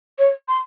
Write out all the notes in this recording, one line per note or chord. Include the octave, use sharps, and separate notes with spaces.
C#5
C6